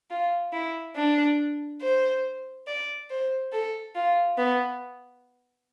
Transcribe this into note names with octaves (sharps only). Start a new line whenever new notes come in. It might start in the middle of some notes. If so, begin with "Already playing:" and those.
F4
E4
D4
C5
D5
C5
A4
F4
B3